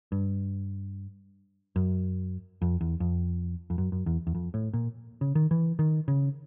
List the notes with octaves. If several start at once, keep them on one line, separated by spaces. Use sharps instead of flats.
G2
F#2
F2
E2
F2
F2
F#2
F#2
E2
E2
F2
A2
A#2
C#3
D#3
E3
D#3
C#3